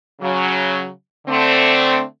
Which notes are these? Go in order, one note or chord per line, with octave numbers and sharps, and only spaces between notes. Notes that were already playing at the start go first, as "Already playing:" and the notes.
C#3 F#3
D3 A3 C4